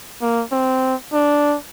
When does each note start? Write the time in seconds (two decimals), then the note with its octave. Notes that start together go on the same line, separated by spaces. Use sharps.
0.21 A#3
0.52 C4
1.13 D4